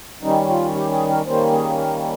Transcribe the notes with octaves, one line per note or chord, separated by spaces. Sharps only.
D#3 G3 C#4 D#4
F4
G4
G#4
A#4
D#3 G3 A#3 C#4 C5
G#4
A#4